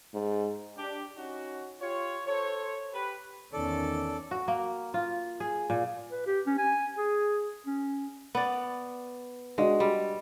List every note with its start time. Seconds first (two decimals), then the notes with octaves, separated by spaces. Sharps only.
0.14 G#2
0.77 D4 G4
1.16 C#4 D#4 F#4
1.81 F4 G4 C#5
2.28 A4 C5 C#5
2.93 G4 B4
3.53 E2 D#3 C#4 A4 D5
4.31 F#4
4.48 A#3
4.94 F4
5.40 G#4
5.70 A#2
6.11 B4
6.26 G4
6.46 C#4
6.58 G#5
6.98 G#4
7.66 C#4
8.35 B3 D5
9.58 G#3 D4 F#4 D#5
9.80 G3